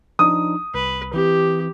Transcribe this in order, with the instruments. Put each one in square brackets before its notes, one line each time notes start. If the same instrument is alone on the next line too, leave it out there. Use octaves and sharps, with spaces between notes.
[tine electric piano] F3 D4 D#4 [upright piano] D#6
[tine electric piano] C2 [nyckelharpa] B4
[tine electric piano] E3 C4 [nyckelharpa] G4